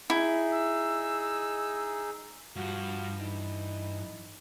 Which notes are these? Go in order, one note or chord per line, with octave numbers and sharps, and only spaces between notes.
D#4 E4 G#4
E6
G2 F3 F#4
E3 D#4